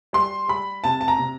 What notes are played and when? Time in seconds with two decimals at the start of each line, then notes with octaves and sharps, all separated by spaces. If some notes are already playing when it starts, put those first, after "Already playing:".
0.13 G3 C6
0.48 G3 B5
0.84 C3 A5
1.01 A5
1.08 A#5
1.19 C3